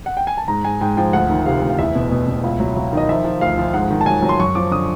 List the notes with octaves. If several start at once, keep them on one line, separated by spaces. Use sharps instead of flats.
F#5
G5
G#5
A5
G#2 A#5
G#2 G#5
G#2 G5
F3 G5
D2 F#5
D#3
C3 F5
D2
F5
E2 E5
B2
B2
B2
C#2
F#3
F#3
D#3 D#5
F3 E5
F3
D2 F5
F3
G#2 F#5
D#3
A5
F#3 G#5
F#3
C6
F#2 C#6
F3 D6
D3 D#6